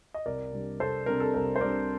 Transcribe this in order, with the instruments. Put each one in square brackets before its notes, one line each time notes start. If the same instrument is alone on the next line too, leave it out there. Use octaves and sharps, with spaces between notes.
[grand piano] D#5
C2 A#4 D5
C3 G3 D4
C2 A4 C5
C3 G3 D4 A#4
A4
C2 A#4
C5
C3 G3 D4 A#4 D5